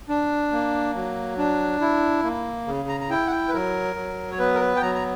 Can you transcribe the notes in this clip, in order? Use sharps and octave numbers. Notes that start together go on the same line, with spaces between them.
D4
A#3
F#3
D4
E4
A#3
C#3
A#5
A#5
E4 G5
F#5
G5
B4
F#3 A#4
F#3
C#5
B3 B4
A#4
B4
G5
F#3 A#5
A#5